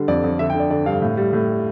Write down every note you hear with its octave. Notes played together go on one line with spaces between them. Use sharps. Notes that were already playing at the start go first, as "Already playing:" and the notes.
Already playing: D3 G3
F2 D5
F2
D3 E5
G5
D3
D5
D3 D5
G2 F5
A2
G3
A2
G3